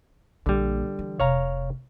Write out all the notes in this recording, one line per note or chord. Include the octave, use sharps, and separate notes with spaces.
A#1 D3 G3 A#3
E3
F1 C3 C#5 F5 A#5